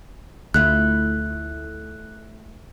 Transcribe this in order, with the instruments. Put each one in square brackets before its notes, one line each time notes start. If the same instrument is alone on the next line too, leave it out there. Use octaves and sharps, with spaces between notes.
[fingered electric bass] D2 [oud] A3 E4 F4 [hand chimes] F#6